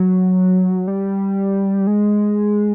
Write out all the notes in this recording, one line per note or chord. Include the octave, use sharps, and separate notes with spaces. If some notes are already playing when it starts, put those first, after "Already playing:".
Already playing: F#3
G3
G#3